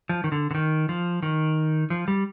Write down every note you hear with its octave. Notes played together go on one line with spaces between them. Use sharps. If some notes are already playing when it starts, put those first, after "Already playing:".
F3
D#3
D3
D3
D#3
F3
D#3
F3
G3